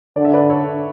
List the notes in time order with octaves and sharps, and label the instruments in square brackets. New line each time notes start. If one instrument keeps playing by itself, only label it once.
[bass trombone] D3 [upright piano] D5
[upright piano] E5
B4 D5
A4 C#5